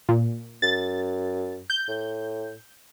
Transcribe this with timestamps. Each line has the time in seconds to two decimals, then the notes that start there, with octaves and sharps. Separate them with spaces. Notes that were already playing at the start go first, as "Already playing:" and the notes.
0.09 A#2
0.62 F#2 A6
1.70 G6
1.88 A2